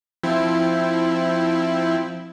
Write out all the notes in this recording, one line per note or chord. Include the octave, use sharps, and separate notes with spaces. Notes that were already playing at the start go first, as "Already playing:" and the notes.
F3 C4 E4